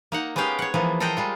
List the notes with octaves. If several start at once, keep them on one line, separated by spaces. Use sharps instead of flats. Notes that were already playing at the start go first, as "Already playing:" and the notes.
A#3 D#4 F#5
G#3 B3 C#4 G4 F5 G5
C#5 F#5
E3 F3 G#3 A#3 B3
A4 A#4 C5 D#5 F#5 G5
G3 G#3 F4